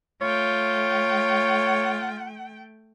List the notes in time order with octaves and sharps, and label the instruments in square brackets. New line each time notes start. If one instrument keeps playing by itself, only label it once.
[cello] A3 G5 [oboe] F4 [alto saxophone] C#5